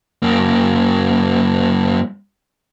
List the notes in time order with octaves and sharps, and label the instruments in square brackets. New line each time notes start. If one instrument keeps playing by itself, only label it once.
[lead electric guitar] F#2 A#3